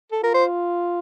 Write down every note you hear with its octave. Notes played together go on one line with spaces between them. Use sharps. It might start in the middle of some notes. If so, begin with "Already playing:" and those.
A4
F4 A#4
C5